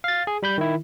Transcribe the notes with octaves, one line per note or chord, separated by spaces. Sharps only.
F5 A6
G#4
G3 B5 G6
D#3 E4